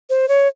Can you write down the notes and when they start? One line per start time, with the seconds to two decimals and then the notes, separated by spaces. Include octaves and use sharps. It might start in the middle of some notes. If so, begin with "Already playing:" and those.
0.10 C5
0.28 C#5